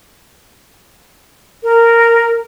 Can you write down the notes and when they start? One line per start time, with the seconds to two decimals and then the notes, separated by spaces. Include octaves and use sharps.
1.64 A#4